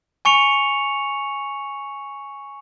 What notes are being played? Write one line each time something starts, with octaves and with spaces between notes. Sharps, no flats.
G#5 C#6 C#7 F7